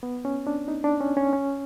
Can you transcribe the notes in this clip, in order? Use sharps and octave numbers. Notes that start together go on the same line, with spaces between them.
B3
C#4
D4
D#4
D4
C#4
C#4
C#4